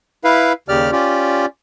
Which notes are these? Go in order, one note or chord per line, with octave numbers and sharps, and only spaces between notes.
E4 B4 F5
D#2 C#3 G4 D5 F6
C#4 F4 G4 D5